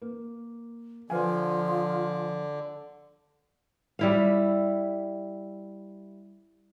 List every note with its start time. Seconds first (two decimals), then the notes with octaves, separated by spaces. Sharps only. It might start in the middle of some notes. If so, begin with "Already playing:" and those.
0.02 A#3
1.10 D3 F3 C5 F5 G#5
3.99 G3 E4 F5